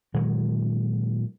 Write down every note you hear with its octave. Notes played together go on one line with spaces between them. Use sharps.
A#2 D#3 F#3 G#3